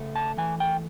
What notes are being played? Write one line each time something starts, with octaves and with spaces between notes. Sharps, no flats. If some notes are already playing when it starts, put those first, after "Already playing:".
Already playing: C#3 A3
A5
E3 G#5
G5